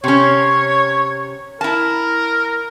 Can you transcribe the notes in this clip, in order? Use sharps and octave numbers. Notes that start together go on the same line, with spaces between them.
C3 C#4 C#5
E4 A#4 A5